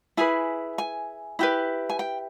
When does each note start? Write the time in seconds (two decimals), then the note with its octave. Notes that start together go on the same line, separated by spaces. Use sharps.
0.17 E4 G#4 B4 G#5
0.78 G#5
1.39 E4 G4 B4
1.90 G#5
1.99 G5